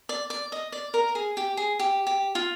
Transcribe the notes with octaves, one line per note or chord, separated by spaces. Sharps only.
D5
D5
D#5
D5
A#4
G#4
G4
G#4
G4
G4
F4